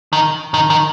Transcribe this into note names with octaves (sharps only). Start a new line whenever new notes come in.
D#3
D#3
D#3